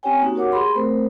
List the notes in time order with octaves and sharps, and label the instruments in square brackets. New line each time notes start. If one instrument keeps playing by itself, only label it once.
[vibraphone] C4 C#4 G4 C#5 G5 G#5
A#3 C#4 D#4 F#4 G4
F#4 A#4 C#5 F#5 D6
G4 G#4 B5 C6
A3 C4 A#4 C5